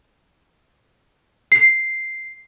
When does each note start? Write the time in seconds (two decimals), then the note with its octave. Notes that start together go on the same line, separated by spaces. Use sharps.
1.52 C7